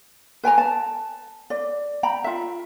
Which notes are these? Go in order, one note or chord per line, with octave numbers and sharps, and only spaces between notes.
B4 G5 G#5 A#5
A5
D5
G5 A#5 B5
F4 E5